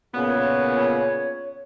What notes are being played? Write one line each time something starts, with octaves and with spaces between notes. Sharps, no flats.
A#2 C#3 B3 C#5